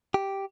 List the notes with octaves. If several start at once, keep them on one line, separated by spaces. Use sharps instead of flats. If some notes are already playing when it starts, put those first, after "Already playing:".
G4